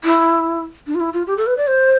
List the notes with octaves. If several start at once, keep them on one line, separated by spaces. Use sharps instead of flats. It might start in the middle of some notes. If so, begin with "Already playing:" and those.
E4
D4
F4
E4
F4
G4
A4
B4
D5
C5